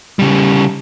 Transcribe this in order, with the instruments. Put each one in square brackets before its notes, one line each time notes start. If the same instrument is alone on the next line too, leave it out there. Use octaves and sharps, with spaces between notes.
[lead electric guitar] C#3 G3